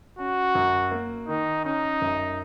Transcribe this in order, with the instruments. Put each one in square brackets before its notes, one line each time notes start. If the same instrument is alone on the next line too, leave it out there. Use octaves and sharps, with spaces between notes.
[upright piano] C#4 [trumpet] F#4
[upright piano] F#2
A#3
[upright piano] D#3 [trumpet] D#4
[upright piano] C#4 [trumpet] D#4
[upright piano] F#2